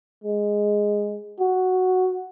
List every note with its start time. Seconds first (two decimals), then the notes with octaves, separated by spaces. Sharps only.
0.24 G#3
1.40 F#4